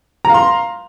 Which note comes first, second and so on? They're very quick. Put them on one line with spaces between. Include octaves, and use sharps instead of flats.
A#5 F5 C6